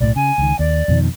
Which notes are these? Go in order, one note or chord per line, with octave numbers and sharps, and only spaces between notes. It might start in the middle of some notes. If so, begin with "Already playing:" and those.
B1 A2 D5
C#3 G#5
C#2 D#3
D#2 D5
F2 B2 D#3